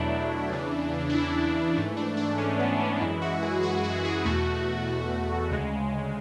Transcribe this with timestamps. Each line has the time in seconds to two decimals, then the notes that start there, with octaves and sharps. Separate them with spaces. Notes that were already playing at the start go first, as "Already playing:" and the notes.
Already playing: E2 B2 F#3 A3 D4 E4
0.51 E2 C#3 E3
1.10 D4
1.14 E4
1.76 G#2 E3 A3
1.97 D4
2.17 D4
2.38 C#4
2.59 B3
2.80 C#4
3.01 F#2 E3 G#3 E4
3.22 F#4
3.42 G#4
3.63 F#4
3.84 F#4
3.97 F#4
4.05 G#4
4.25 E2 B2 A3 F#4
5.50 D2 C#3 G#3